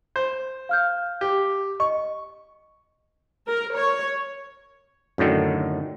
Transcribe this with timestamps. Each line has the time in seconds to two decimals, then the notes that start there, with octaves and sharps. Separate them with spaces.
0.16 C5
0.69 F5 F6 G6
1.21 G4
1.80 D#5 C#6
3.48 A#4
3.77 C#5
5.18 F#2 A2 D3 D#3